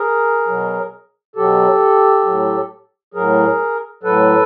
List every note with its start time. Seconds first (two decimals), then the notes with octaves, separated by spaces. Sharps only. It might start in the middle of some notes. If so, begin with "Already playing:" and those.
Already playing: G#4 A#4
0.48 B2 F#3
1.36 B2 F#3 G4 A4
2.25 A2 F#3
3.14 A2 F#3 G#4 A#4
4.03 A2 F#3 A4 B4